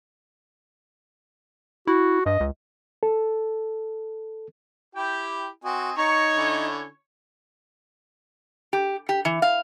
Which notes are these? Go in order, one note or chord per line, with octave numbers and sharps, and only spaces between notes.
E4 F#4
G2 D#5
C#2
A4
E4 G4 G5
C4 F#4 D#5 G#5
D#4 C#5 A#5 C#6
D3 C#4 E4
G4
G4
E3
F5